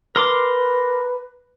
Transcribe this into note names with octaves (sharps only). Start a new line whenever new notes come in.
A#4 B4 C6 D6